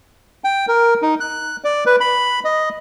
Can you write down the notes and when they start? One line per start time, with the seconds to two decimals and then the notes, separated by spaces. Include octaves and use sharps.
0.44 G5
0.68 A#4
1.02 D#4
1.20 F#6
1.64 D5
1.86 B4
2.00 B5
2.44 D#5